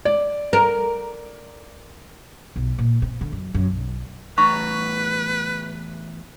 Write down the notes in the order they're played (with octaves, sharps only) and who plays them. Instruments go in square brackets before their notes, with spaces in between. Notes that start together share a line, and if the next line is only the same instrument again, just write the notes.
[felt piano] D5
[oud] A#4
[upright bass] B1
A#2
C4
D3
F#2
F#2
B1
[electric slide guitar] E2 A2 A#5 [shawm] B4 [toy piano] C#6